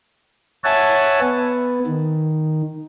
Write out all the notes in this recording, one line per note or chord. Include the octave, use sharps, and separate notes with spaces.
C#5 E5 F#5 G#5 A5
B3
D#3